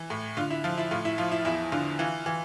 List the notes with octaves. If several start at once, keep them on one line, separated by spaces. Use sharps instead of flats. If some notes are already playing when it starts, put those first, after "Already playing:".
Already playing: E3
A2
D3 F4
E4
F3 F4
E4
A2 F4
E4
F3 F4
E4
E2 E4
D3 F4
E3 F4
E3